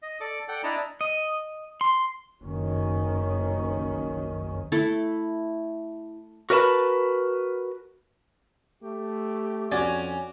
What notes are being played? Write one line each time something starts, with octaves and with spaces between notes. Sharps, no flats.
D#5
A4 D5 D6
A4 D5 F#5 G5
D4 E4 D5 D#5 A5 A#5
D#5
C6
F#1 B1 G2 D#3 C#4
A3 E4 A4
F#4 A#4 B4 D5 A5 B5
A3 G4
F2 C#4 F#4 D5